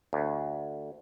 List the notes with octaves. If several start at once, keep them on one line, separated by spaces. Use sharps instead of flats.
D2